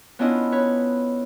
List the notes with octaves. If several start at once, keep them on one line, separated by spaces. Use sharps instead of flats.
B3 C#4 D4 E4 F4 D#5
B4 C#5